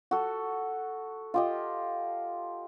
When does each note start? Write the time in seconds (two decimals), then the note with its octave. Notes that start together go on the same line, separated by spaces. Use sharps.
0.11 F#4 A4
1.34 F4 G4 D#5